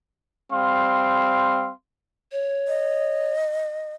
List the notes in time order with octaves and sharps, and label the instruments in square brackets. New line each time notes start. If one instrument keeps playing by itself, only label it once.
[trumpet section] G3 C4 F5 C6
[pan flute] C#5
[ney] D#5